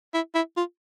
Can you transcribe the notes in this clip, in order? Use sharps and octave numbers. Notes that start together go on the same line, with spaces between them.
E4
E4
F4